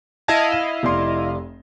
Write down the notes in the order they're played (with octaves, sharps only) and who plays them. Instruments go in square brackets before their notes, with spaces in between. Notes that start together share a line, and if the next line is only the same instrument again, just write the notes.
[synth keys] E4 D#5 F5 [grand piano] A5 G#6 A#6
[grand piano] E7
F1 D5 C6